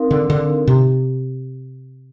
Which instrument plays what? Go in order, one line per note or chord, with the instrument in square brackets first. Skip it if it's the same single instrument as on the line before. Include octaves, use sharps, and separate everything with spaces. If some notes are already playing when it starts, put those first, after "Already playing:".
Already playing: [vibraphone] C4 D#4 A#4 F5
[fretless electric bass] D3
D3
C3